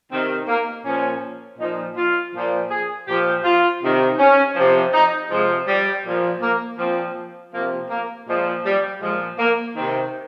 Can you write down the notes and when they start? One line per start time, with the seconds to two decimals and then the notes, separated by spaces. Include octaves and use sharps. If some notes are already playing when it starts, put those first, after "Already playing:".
0.11 C3 D#3 C4
0.48 A#3
0.85 A#2 F3 C#4
1.59 A#2 F3 D#4
1.96 F4
2.34 A#2 F3
2.70 G#4
3.08 A#2 F3 G4
3.44 F4
3.82 C3 D#3
4.19 C#4
4.56 C3 F3
4.93 D#4
5.31 C3 F3 G#3
5.68 G3
6.04 A#2 F3
6.42 A#3
6.79 A#2 F3 C4
7.53 C3 F3 A#3
7.90 A#3
8.27 A#2 F3 G#3
8.65 G3
9.01 A#2 F3 G#3
9.39 A#3
9.75 C3 D#3 C4